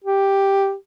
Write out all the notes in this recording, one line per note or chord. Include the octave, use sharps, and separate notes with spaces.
G4